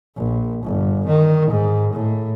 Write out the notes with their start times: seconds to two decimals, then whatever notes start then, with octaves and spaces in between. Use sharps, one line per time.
0.17 A#1
0.64 G1
1.07 D#3
1.50 G#2
1.93 A2